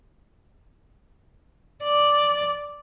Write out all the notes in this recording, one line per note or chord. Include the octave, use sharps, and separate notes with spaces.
D5